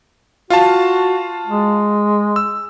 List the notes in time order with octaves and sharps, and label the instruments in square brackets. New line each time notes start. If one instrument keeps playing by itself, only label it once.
[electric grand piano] F4 F5 A5 [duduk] F#4
[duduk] G#3
[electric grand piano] E6